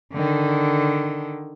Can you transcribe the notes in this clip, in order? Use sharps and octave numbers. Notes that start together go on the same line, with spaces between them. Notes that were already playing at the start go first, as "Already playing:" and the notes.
D3 D#3